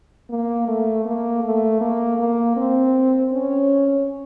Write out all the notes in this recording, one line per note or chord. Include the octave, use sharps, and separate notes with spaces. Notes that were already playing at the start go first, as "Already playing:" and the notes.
A#3
A3
A#3
A3
A#3
A#3
C4
C#4